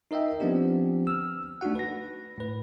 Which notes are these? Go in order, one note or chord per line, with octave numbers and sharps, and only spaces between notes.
D#4 A#4 D#5 E5 G5
F3 B3 C4 D4 G4
E6 F6
A3 D4 D#4 F#4 F#5
B4 A#6
A2 B4